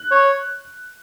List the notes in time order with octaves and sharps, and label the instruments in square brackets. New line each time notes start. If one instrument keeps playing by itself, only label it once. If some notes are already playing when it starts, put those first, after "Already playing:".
Already playing: [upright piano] F#6
[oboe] C#5